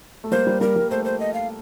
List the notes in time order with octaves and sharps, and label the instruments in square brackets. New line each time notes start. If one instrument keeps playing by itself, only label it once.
[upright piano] A3
[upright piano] G3 A#3 [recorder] C5
[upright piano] G3
[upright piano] G3 [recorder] A#4
[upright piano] G3 A#3
[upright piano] A3 [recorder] C5
[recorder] C5
D#5
F5